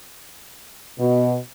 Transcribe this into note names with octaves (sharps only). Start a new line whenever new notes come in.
B2